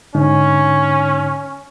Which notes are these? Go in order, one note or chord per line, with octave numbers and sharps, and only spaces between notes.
G#2 D3 C#4 D#4